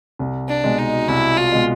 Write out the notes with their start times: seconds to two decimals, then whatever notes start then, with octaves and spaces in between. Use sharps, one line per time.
0.19 C2
0.49 D4
0.64 B2 G#3
0.78 D#4
1.08 C2 E4
1.37 F4
1.52 B2 G#3